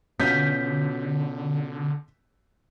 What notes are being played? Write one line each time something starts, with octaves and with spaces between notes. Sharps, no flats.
B2 D3 C#4 F4 F#4 G6 B6